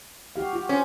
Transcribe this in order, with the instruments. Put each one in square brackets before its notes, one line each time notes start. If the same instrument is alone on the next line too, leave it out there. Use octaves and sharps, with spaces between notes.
[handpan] F#4 G4 F5
F4 F#4
[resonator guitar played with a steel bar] C#4 [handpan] C5